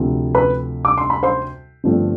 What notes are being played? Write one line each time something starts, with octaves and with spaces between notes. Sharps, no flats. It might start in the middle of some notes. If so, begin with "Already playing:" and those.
Already playing: D2 C3 F3
B4 B5
D6
C6
B5
C5 C6
G1 G2 F3 A3 C4